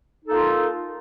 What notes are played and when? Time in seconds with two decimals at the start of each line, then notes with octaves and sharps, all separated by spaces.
0.25 D#4
0.28 A4
0.31 A#3
0.34 F4